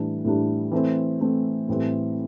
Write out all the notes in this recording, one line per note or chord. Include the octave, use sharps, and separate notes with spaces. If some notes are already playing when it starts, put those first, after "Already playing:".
Already playing: A2 E3 G3 D4
A2 E3 G3 D4
E3 A3 C4
E3 A3 C4
A2 E3 G3 C4